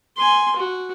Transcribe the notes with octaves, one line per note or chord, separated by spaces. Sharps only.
G#5 C6
F#4